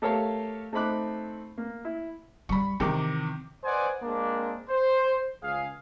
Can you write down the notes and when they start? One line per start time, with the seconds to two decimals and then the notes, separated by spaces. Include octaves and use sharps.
0.02 A3 G4 A4 A#4 C#5 F5
0.73 A3 C4 D#4 B5 D6 F#6
1.58 A#3
1.85 E4
2.49 G3 B5 C#6
2.80 C3 D#3 E3 C4 D6
3.64 B4 C5 D5 D#5 F#5 G#5
4.03 G#3 A#3 C4 D4
4.69 C5
5.43 C#2 G#4 F5